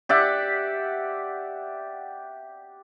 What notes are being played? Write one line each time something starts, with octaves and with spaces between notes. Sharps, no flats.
G4 D5 E5 F#5